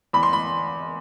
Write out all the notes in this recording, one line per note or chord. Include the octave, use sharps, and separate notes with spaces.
E2 B5
C6
B5